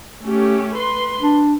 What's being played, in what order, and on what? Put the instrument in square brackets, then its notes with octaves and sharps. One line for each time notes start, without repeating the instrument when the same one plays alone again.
[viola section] A3 C#4 G4
B4 C6
[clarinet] D4